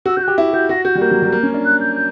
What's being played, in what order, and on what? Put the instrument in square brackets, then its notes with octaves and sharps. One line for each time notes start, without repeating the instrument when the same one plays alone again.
[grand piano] F#4 [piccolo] E6
[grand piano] F#4 [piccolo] G6
[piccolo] F#6
[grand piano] G4
E4
[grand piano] F#4 [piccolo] G6
[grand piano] F#4 [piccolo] A#6
[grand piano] F#4 [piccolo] G6
[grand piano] G3
[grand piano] A#3 [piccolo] G6
[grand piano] F#3
G3
A#3
C#4
D4
[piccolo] F#6
G6
G6